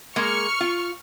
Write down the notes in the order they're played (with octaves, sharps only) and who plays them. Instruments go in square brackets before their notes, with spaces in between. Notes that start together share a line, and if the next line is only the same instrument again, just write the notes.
[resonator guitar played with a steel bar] G#3 A#3 [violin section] C#6 F6 C#7
[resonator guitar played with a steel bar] F4